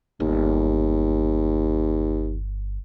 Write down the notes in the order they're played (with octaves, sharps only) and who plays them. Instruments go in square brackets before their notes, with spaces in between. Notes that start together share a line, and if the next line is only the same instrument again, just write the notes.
[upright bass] G1 [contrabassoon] D#2